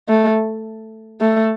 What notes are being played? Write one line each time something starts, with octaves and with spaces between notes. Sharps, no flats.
A3
A3